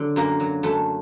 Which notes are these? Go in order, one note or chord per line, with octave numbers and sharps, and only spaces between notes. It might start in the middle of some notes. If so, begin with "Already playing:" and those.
Already playing: D3 F#3
F#2 A#3
F#3
F#2 A3